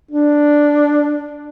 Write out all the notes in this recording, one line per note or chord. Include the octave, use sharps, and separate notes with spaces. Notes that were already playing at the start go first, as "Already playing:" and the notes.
D4